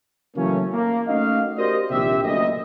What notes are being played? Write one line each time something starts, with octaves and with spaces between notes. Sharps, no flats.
C#3 E3 F#3 A3 A#3 C#4
A#3
A3 C#4 D#4 F#4 D#5 F5
F#4 G4 A#4 C5 D5 D#5
A#1 D#2 C3 G4 E5
F#1 D2 D#5